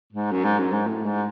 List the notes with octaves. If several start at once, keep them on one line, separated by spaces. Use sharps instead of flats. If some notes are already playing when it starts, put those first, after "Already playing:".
G#2
F#2
G#2
F#2
G#2
A2
G#2